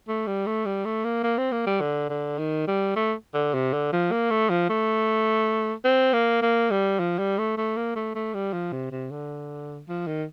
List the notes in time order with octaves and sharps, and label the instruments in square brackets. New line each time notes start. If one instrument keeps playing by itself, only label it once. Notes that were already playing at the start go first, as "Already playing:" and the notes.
[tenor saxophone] A3
G3
A3
G3
A3
A#3
A#3
C4
A#3
G3
D3
D3
D#3
G3
A3
D3
C3
D3
F3
A#3
A3
F3
A3
C4
A#3
A#3
G3
F3
G3
A3
A3
A#3
A3
A3
G3
F3
C3
C3
D3
F3
D#3